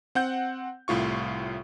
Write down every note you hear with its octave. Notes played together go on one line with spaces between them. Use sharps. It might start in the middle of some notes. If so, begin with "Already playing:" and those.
C4 F#5 G6
C2 A2 F4 C#6